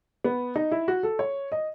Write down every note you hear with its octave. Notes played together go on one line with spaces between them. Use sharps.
B3
D#4
E4
F#4
A4
C#5
D#5